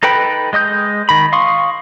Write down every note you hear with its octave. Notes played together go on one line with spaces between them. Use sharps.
D#4 A4 B4 G5 B5
G#3 D#5 D#6 G6
D#3 B5
F5 C6 C#6 D#6